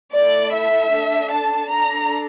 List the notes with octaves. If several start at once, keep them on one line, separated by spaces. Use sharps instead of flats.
A3 E4 A4 D5
E5
D4 A4
A5
D4 A4 A#5